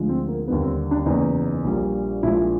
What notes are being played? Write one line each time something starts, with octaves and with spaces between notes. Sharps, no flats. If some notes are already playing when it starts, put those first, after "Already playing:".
Already playing: D2 D3 F3 G#3
C4
A#3
D#2 D3 G3 B3
C4
D4
F#1 E2 C#3 D#4
A#1 A#2 G3
A#1 A#2 F3 G#3 E4